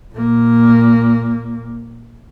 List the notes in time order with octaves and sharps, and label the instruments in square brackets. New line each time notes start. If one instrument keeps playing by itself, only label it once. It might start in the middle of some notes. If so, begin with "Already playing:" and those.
[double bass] A#2 A#3